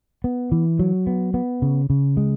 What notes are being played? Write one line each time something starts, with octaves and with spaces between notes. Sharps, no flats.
B3
E3
F#3
B3
B3
C#3
C#3
G#3